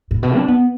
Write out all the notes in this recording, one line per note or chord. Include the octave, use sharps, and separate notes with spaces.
A2
B2
D4
B3